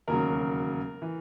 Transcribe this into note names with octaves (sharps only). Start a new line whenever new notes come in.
E1 D#2 C#3 F#3 A#4
E3